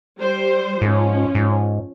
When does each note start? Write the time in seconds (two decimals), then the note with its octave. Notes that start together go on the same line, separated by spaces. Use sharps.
0.18 G3 C5
0.81 G#2 F3 C#4
1.35 G#2